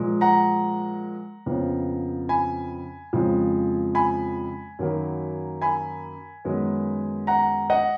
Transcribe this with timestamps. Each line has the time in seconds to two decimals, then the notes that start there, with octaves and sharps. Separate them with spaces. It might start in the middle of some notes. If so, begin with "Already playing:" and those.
Already playing: A#2 F3 G#3
0.21 F#5 A#5
1.46 F2 C#3 F3 B3
2.29 G#5 B5
3.13 F2 C#3 F3 G#3
3.95 G#5 B5
4.79 F#2 D#3 F#3 A#3
5.62 G#5 B5
6.45 F#2 D#3 G#3 B3
7.27 F#5 A#5
7.70 D#5 F#5